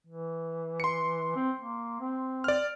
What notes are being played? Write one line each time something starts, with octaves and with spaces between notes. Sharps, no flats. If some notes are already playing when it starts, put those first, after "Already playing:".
E3
C6 C#7
C4
A#3
C4
D5 F6